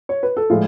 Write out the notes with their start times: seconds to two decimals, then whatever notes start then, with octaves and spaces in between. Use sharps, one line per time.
0.09 C#5
0.23 B4
0.37 A4
0.50 A2 F3 G#3 F4 G#4